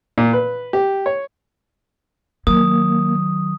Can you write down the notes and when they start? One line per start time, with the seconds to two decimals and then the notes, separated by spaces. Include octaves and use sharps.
0.18 A#2
0.33 B4
0.73 G4
1.06 C#5
2.47 D#3 F#3 A#3 D#6